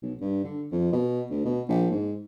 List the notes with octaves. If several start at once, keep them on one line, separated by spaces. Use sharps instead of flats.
B1
G2
D3
F2
B2
D2
B2
A#1
G#2